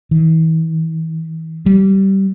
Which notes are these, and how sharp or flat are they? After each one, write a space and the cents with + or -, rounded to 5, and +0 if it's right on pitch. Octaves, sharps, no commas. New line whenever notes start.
E3 -35
G3 -20